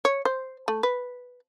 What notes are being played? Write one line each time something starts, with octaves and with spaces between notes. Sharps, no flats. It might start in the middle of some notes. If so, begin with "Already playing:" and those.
C#5
C5
A3
B4